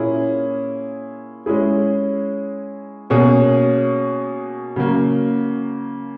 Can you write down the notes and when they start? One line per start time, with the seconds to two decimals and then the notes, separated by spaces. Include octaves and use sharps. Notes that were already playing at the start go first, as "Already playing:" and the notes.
Already playing: A#2 A#3 C#4 E4 G#4
1.46 G#3 C#4 E4 G#4
3.10 B2 A#3 C#4 G#4
4.76 C#3 F#3 A#3